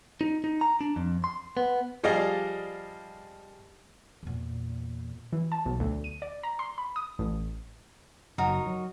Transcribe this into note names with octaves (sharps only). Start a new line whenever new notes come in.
D#4
D#4
A#5
D4
F2
C6
B3
F3 G3 G#4 D5 D#5 F5
E2 A#2
E3
A5
B1
D2
D#7
D5
A#5
C6
B5
D#6
A1
F#1 F#3 D#4 F#4 A#4
F#3